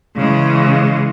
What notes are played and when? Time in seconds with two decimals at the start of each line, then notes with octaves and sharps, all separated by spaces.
0.14 C#3 E3 G#3